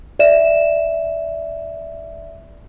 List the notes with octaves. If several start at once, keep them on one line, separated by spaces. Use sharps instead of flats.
D5 E5 E7